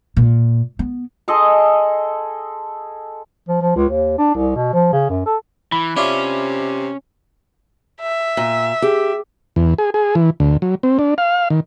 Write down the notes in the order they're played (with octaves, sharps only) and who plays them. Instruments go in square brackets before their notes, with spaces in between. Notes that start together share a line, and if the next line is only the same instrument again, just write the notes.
[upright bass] A#2
B3
[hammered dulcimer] G#4 A4 D#5 C6
[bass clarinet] F3
F3
C#2
D#2
D4
C2
B2
F3
C#3
F#2
A4
[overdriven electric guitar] E3 [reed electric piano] B5
[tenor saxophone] C3 [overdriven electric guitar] C#4 [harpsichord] D4 E4 F4
[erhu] E5
[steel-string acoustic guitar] A#2
[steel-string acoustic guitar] G4 [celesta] G#4
[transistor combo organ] E2
G#4
G#4
E3
D2
F#3
C4
D4
F5
D#3